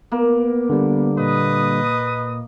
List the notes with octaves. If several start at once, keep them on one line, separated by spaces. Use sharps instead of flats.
A#3 B3
D3 G3 B3
A#2 B4 D#5 D#6